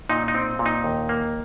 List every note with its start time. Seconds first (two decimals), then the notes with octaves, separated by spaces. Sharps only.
0.09 A#2 D#4
0.28 D#4
0.35 C4
0.59 A#2
0.66 D#4
0.84 D#2
1.09 A#3